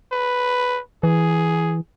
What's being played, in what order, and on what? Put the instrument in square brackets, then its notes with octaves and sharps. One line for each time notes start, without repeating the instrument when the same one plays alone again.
[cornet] B4
[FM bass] E3 [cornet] G#4